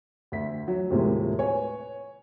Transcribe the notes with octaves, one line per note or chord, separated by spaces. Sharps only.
D2 E5 B6
F#3
D#2 A2 C3 F3 G#3 A#3
B4 C#5 G#5